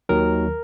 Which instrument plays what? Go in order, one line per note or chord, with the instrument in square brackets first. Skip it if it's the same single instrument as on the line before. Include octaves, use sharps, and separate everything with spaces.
[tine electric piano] D#2 D#3 F#3 A#4